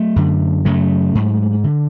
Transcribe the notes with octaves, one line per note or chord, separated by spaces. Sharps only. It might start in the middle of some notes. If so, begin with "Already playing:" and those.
Already playing: F#3 A3
F#2 D3
F#2 C#3 F#3 A3
G#2
D3